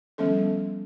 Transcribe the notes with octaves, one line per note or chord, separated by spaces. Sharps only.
D#3 F3 G3 B3 C#4 A4